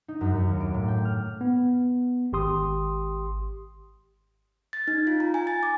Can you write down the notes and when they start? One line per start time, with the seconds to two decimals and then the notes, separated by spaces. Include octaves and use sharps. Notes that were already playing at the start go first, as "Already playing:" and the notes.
0.08 D#4
0.21 F#2
0.34 F#2
0.48 D#2
0.60 D6
0.74 A2
0.88 G5
1.05 F6
1.41 B3
2.33 G#1 G4 C6 D#6
4.73 A6
4.88 D#4
5.07 F4
5.20 A#5
5.34 G#5
5.47 A6
5.63 D6